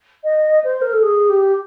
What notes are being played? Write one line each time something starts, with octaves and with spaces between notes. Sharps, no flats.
D#5
C5
A#4
A4
G#4
G4